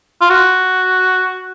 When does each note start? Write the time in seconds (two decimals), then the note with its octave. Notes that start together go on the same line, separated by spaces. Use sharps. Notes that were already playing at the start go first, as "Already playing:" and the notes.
0.21 F4
0.30 F#4